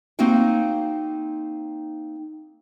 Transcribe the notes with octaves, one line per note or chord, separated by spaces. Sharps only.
A#3 C4 D#4 F#4 F5 G5